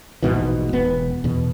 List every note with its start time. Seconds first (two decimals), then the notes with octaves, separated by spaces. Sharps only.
0.23 A#1 G#2 B2 E3
0.73 E1 B3
1.24 E2 B2